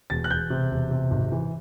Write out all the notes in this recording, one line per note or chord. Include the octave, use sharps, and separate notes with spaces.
E1 A6
F#6
E1 G6
C3
E1
C3
G#1
E3